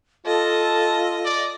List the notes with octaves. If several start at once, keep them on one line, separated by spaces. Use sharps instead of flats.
F4 A4 D#5 A5
D5